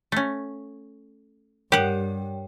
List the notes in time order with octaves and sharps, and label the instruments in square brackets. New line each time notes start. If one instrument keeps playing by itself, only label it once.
[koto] A3 C#4
[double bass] G2 [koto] G4 F#5 [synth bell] A#4 C#5 G5